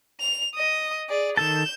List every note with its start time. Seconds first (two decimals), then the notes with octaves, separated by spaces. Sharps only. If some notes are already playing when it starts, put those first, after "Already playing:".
0.20 F7
0.55 D#5 D#6
1.09 G#4 D5
1.37 D#3 A4 A5 G6 E7